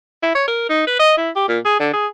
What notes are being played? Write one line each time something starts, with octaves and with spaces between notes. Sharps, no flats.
E4
C#5
A#4
D#4
B4
D#5
E4
G4
A#2
G#4
D3
G#4